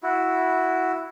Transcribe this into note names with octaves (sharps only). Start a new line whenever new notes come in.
E4 F#4